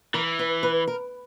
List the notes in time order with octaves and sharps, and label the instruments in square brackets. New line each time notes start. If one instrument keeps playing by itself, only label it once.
[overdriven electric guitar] E3 [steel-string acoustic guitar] A#4
[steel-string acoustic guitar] B4
B4
A#4